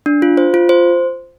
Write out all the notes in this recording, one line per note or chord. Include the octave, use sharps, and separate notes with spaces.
D4
F4
C5
F4
C5